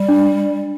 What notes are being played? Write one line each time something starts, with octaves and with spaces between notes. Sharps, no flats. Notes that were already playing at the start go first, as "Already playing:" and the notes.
Already playing: G3
D4